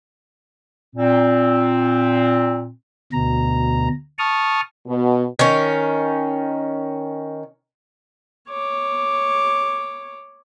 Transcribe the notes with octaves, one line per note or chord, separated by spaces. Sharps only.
A#2 C4
D2 B2 A#5
A5 C#6 D#6 F6
B2
D#3 C#4
C#5 D6